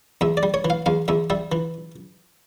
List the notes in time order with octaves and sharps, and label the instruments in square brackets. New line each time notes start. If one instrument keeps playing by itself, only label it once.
[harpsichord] E2 E5
D5
G3
C#5
E3
F5
E2 F5
E2 E5
G3 E5
E3